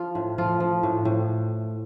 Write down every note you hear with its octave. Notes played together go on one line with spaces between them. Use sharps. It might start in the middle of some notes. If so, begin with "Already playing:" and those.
Already playing: F3 F4
A2
F3 F4
F3
A2
A2